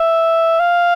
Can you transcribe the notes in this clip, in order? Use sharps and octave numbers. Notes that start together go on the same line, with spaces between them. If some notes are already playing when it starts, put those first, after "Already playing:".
Already playing: E5
F5